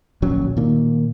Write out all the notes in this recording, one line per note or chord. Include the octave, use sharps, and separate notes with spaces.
D1 A#1 F#3 C#4
A#2 D#3 A#3